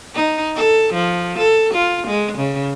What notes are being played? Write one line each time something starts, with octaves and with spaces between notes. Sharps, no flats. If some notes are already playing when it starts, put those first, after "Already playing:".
D#4
A4
F3
A4
F4
G#3
C#3